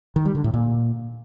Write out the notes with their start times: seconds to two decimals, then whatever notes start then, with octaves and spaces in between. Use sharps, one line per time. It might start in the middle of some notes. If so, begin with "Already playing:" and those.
0.16 D#3
0.25 G3
0.35 D3
0.44 A2
0.54 A#2